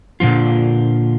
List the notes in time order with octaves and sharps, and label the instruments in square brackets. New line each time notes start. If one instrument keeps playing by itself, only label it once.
[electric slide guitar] A#2 D3 F3 F4